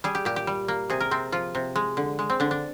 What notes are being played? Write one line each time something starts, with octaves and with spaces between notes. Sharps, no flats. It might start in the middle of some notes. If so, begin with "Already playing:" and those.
G3 G#4
G4
A#2 G4
G4
G3
A#3
C3 G#4
A#4
C3 C4
F3 F4
C3
G#3
D3
G#3
C4
D3 D4
D4